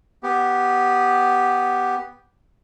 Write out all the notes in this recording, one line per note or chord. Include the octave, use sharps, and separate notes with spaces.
B3 G4